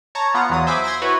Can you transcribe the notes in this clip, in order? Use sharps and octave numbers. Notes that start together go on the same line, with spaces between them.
C#5 A5 A#5
B3 F4 F#5 A#5
E2 F#3 D#6
C5 E5 G#5 B5 D6
C6 G#6 A#6 D7
E4 F#4 B4 C#5